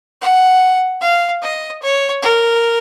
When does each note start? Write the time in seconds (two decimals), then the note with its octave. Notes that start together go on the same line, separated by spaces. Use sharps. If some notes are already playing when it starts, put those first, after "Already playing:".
0.22 F#5
1.01 F5
1.43 D#5
1.82 C#5
2.23 A#4